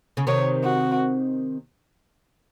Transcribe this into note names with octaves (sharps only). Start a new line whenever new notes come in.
C#3
C3 D#3 C#5
F#4